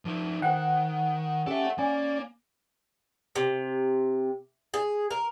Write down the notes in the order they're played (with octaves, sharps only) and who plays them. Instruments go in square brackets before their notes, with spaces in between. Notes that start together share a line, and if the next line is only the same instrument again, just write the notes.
[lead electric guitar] F3 D#4
[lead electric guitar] D#3 [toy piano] C5 G5 [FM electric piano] F#5
[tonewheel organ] C#4 G4 D6 [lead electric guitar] A4 E5
[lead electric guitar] A#3 [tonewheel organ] C#4 D5 [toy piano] G#5
[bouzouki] C3
G#4
A#4